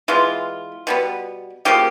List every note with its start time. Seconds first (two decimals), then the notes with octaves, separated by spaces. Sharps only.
0.08 E3 G#3 B3 F4
0.87 B2 G3 B3
1.65 C#3 F3 A#3 G4